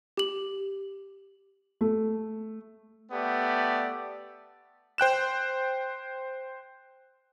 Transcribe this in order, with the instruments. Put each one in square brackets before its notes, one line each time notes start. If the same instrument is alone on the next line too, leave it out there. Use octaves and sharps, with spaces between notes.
[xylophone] G4 F#7
[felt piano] A3
[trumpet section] A3 B3 G4 D5
[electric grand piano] C5 G5 F#6 E7